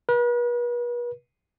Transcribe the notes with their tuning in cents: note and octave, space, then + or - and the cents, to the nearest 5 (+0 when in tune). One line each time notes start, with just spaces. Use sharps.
B4 -40